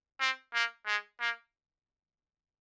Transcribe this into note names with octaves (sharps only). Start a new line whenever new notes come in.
C4
A#3
G#3
A#3